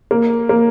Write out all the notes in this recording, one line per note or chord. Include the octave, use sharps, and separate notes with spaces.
A#3
A#3